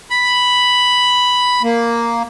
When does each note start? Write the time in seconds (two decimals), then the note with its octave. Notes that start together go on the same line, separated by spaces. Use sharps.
0.10 B5
1.63 A#3